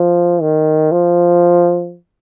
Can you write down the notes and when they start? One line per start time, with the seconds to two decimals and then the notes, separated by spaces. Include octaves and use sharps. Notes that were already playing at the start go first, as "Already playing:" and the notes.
Already playing: F3
0.41 D#3
0.92 F3